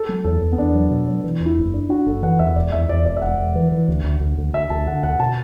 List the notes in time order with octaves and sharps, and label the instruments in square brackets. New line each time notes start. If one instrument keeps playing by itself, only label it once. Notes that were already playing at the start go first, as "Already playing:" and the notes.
Already playing: [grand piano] A4
[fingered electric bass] F#3
[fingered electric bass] E2 [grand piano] A4
[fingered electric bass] E2
[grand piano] B3
[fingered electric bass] E2 [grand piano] D4
[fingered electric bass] F#3
B2
F#3
E3
E2
[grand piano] E4
[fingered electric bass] F#1
D4
[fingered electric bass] D4 [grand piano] F#4
[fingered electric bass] F#1 [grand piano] A4
[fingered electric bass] E3 [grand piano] F#5
[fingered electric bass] E2 [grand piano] E5
[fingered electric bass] E1 [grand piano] D5
[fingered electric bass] E2 [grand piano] E5
[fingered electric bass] E2 [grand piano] D5
[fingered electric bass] E1 [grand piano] D5
[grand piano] E5
[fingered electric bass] E1 [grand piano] F#5
[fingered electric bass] E1
E3
E3
D2
D2
D2
D2
[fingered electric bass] D2 [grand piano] E5
[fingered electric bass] D2 [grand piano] A5
[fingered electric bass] D3 [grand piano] F#5
[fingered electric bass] D2 [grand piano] F#5
[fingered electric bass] B2 [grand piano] A5